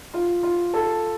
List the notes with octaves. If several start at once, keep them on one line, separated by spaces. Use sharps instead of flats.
F4
F4
A4